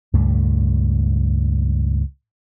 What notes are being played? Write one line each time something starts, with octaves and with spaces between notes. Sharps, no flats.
C#2 G2 A#2 A3